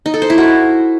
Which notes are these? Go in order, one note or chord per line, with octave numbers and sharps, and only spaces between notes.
D#4
A4
C5
E4
F#4